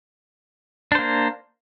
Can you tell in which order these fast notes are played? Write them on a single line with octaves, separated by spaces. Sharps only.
D4 C5 A#3